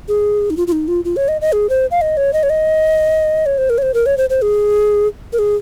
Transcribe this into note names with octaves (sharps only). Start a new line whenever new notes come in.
G#4
D#4
F4
F4
D#4
F4
F4
C#5
D#5
D#5
G#4
C5
F5
D#5
C#5
D#5
C#5
D#5
C#5
C5
A#4
C#5
C5
A#4
C#5
C5
C5
G#4
A#4
G#4